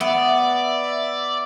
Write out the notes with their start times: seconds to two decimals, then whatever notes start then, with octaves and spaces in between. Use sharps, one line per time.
0.01 B3 D5 E5